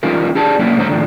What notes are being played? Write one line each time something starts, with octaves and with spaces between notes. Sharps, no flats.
E3 G3 C#4 D#4 F4 A#4
D4 G4 G#4 D5 A5
F#3 A#3 C#4 D4 E4
G#2 D3 C#5 A#5
A2 D#3 F3 D4